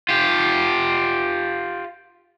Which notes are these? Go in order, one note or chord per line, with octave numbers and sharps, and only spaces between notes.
F4 G4